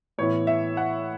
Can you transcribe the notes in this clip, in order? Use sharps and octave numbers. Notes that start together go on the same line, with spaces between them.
A2 E3 B3 E4 C#5
E5
F#5